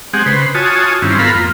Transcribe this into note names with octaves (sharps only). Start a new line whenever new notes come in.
G#3 C4 G4 G#4 F#5
C#3 B4 C5
F4 F#4 C#5 G#5 A5 D#6
G2 D#3 C4 C#4 E4 F4
B3 F4 A4 A#4 F5 B5
F2 A#3 F4